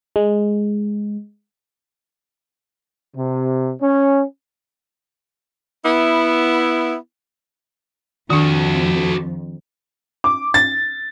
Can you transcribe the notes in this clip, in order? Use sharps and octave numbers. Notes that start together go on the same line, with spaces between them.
G#3
C3
C#4
B3 E4
F2 D#3 D4 F#4 A4
D6
A6